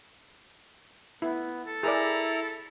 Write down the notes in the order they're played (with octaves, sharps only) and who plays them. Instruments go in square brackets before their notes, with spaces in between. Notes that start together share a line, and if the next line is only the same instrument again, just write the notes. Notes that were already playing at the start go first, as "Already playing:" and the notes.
[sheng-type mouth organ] B3 [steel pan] E4
[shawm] A4
[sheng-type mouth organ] E4 A#5 [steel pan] G#4 A#4 D5